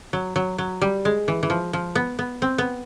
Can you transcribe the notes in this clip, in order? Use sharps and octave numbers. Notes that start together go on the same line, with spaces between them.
F#3
F#3
F#3
G3
G#3
E3
E3
F3
F3
B3
B3
C4
B3